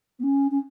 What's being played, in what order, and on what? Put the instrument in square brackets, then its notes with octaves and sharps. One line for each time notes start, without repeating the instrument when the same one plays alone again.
[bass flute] B3
C#4
C#4